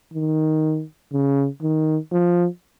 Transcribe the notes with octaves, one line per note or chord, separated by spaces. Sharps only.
D#3
C#3
D#3
F3